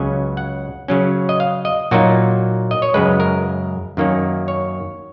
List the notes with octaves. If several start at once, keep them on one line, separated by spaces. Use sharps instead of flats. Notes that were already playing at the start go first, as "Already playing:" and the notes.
Already playing: C#2 C#3 F#3 C#4 G#5
F#5
C#3 F#3 C#4
D#5
F5
D#5
A#2 F#3 A#3 D#4 F#4
D#5
C#5
F#2 C#3 G#3 B4
A#4
F#2 D#3 A#3 C#4
C#5